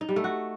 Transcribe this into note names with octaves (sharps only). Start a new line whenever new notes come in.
D#4
G3
A3
F#4